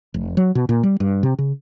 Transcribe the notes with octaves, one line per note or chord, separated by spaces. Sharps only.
F1
F#3
B2
A#2
G3
G2
C3
C#3